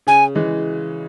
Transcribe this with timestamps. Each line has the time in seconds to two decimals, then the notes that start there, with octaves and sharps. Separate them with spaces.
0.07 C#3 G#5
0.35 E3 G#3